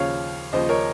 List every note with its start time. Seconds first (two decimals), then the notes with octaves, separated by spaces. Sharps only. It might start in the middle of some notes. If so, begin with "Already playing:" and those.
Already playing: D#2 C#3 F3 C#5 F5
0.53 D#2 C#3 F3 C5 D#5
0.69 A#4 C#5